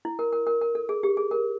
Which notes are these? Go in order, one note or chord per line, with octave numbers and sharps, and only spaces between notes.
E4
A#4
A#4
A#4
A#4
A4
G#4
G4
G#4
A#4